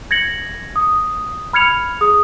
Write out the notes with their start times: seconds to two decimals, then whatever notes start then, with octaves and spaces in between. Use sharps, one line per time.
0.11 G#6 A#6 C#7 F#7
0.76 D#6
1.53 B5 F6 G#6 C#7 F7
2.01 G#4 D#6